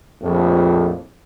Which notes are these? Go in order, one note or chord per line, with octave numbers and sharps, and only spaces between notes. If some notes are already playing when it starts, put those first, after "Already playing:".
A#1 F2 A2